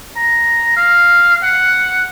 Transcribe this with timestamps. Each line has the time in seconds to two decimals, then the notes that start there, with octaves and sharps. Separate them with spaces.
0.16 A#5
0.76 F5
1.43 F#5